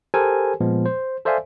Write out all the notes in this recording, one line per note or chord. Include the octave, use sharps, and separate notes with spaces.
G4 A4 A#4 C5 G#5
A#2 F3 G#3 B3
C5
A4 C5 D5 E5 F5 G#5